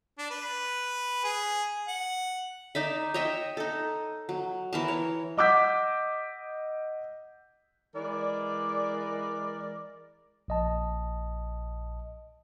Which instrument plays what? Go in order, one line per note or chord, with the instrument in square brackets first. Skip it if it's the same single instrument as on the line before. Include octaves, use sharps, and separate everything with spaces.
[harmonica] D4
B4
G#4
F#5
[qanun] D#4 D5 E5
C#5 D#5 E5 G5
D#4 A4
F#3
E3 A#4 A5
C#5
[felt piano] D#5 F#5 D6 E6 G6 B6
[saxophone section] E3 G#3 A#4 D5
[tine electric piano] A#1 D#5 A5